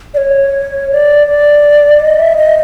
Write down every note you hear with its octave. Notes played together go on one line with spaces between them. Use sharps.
D5
C#5
D5
D5
D#5
E5
D#5